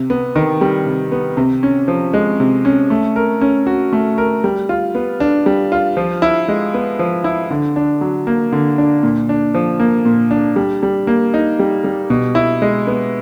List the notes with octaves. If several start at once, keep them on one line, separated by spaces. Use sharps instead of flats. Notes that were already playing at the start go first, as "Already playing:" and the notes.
Already playing: C3
B3
D#3
G3
C3
B3
C3
C#4
F3
G#3
C3
C#4
A3
A#4
C#4
F#4
A3
A#4
G3
F4
B3
D4
G3
F4
F3
E4
G#3
B3
F3
E4
D3
D4
F#3
A#3
D3
D4
A#2
D4
F3
A#3
A#2
D4
G3
G3
A#3
D#4
G3
G3
B2
E4
G#3
B3